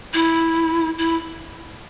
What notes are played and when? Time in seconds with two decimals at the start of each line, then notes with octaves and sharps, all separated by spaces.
0.14 E4
0.98 E4